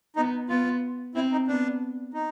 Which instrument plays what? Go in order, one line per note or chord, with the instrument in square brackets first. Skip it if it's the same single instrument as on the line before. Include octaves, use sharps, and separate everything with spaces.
[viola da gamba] B3 [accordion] D#4
[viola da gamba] B3 [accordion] F4
[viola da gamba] C4 [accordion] E4
[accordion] D#4
[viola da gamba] B3 [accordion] D4
[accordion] D#4